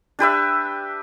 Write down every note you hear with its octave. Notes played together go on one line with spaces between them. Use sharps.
D4 G4 B4 E5